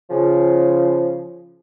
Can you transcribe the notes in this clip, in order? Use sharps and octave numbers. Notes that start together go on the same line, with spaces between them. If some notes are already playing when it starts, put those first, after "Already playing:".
C#3 F3